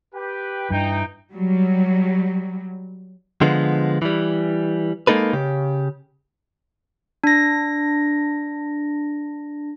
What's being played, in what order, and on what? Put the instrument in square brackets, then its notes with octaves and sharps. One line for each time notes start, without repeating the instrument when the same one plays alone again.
[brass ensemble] G4 B4 G5
[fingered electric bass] G2 [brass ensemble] E3 D#4 G5
[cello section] F#3 G3
[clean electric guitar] D3 F3 G#3 B3
E3 G3
G#3 A#3 D#4 A4 B4
C#3 G4
[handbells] D4 A#6